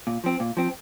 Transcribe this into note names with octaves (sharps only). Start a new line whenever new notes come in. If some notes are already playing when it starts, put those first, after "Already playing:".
A#2
F3 C4
A#2
F3 C4